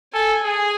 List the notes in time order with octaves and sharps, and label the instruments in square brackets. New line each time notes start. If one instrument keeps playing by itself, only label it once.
[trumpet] A4 [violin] G#5
[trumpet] G#4 [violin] G#5